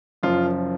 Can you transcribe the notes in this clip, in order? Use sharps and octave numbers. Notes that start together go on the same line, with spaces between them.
F#1 F#2 F3 F4